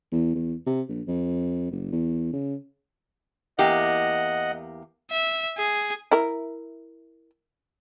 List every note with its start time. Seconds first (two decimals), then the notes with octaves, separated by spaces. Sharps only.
0.12 E2
0.35 E2
0.66 C3
0.89 A#1
1.08 F2
1.71 F#1
1.92 E2
2.33 C#3
3.59 E2 A#3 G4 D#5 F#5
5.11 E5
5.58 G#4
6.11 E4 A#4